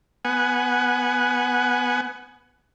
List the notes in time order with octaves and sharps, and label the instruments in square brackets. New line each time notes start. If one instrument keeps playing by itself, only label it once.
[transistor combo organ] B3 F#5 G#5